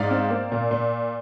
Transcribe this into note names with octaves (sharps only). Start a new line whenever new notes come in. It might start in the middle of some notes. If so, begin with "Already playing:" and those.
Already playing: G#2 D5 F5
C4
A#3
A#2
A#2